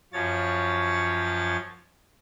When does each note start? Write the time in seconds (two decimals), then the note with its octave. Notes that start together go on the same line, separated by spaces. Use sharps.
0.13 F#2 F3 C#5 A6